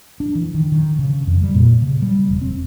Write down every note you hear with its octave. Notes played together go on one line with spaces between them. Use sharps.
D4
E3
D#3
D#3
C#3
F2
G3
A#2
C#3
G3
E1
C4